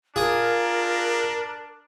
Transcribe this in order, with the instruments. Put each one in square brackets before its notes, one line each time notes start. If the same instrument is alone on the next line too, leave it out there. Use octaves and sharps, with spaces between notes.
[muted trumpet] D4 [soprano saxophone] F4 [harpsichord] G#4 [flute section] A#4